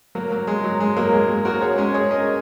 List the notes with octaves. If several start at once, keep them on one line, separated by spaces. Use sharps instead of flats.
F#3 A#3
F#3
G#3
F#3
G#3
F#3 A#3
G#3
G#3
F#4 A#4
G#4 C#5
G#3 C#4
G#4 C#5
A#4 D#5